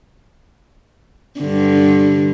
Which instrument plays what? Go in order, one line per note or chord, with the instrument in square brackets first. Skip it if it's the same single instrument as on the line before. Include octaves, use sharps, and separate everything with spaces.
[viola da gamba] G2 D3